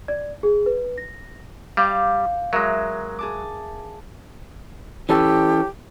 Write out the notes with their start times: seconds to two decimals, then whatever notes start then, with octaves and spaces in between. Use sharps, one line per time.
0.08 D5
0.43 G#4
0.66 B4
0.98 A#6
1.77 G3 F5 G5 D6
2.53 F#3 G#3 A#4 E5
3.19 G#4 A5 D6
5.09 E3 C#4 G4 A4